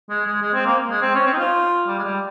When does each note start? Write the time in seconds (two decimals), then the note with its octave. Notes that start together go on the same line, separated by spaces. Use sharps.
0.10 G#3
0.26 G#3
0.42 G#3
0.54 C4
0.66 A#3
0.90 G#3
1.02 C4
1.15 C#4
1.27 C4
1.33 D#4
1.39 F4
1.87 G3
1.99 G#3
2.04 G3